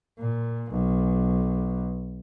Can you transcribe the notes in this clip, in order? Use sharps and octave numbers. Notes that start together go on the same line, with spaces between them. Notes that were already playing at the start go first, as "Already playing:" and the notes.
A#2
B1